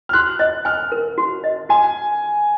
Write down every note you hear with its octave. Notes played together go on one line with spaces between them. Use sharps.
F6
F#4 F#6
D#5 F#6
G#5 F6
A#4
F#4
D#5
F#4 G#5